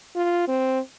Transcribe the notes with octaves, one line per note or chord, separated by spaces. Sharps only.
F4
C4